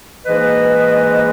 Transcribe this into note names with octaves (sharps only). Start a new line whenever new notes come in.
G#2 E3 A#3 B4 D#5